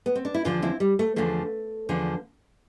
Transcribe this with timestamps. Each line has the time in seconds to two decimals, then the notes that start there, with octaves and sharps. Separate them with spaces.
0.06 B3
0.15 C4
0.25 D4
0.34 E4
0.45 E2 D3 F3 D4 F4
0.62 C4 E4
0.80 G3
0.99 A3
1.16 E2 D3 F3 A3
1.89 E2 D3 F3